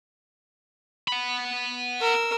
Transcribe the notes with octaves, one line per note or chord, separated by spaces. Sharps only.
F#5 B5
A#4 E6